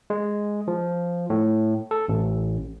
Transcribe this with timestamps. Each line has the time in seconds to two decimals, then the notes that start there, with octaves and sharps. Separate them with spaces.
0.10 G#3
0.68 F3
1.30 A2
1.91 A4
2.08 A1